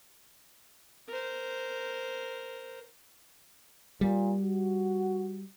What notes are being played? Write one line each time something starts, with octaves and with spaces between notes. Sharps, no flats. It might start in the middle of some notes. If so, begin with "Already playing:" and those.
A#4 C5
A#2 G3
F#4